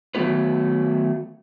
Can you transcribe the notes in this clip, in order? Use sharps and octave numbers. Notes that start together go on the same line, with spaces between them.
D#3 F#3 A3 B3 F4 B4